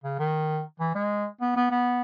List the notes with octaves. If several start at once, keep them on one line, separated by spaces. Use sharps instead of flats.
C#3
D#3
E3
G#3
B3
B3
B3